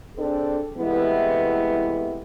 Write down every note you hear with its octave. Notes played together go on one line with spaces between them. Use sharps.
C4 D4 G#4 A4
C3 E3 G#3 A3 B3 E4